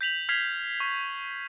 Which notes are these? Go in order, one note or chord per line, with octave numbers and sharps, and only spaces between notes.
G6 B6 F7 F#7
F6 G#6 B6 C7 F7
C#6